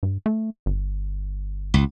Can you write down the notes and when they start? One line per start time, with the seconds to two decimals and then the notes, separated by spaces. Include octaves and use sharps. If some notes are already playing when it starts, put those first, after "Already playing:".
0.03 G2
0.26 A3
0.66 G1
1.74 C#2